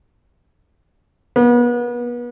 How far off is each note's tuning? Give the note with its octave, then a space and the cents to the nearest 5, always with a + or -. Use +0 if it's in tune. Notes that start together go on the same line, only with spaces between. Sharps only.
B3 -35